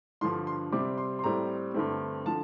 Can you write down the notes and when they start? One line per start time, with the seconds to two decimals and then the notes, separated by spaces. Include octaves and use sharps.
0.21 G2 D3 F3 C6
0.47 C6
0.72 C3 G3 C4 D6
0.98 C6
1.19 C6
1.24 A2 G3 C4 A#5
1.74 G2 D3 A3 C4
2.26 D3 F3 A5